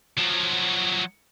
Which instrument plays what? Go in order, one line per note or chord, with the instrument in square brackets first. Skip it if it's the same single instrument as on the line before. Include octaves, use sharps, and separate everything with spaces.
[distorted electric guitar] F3 F#3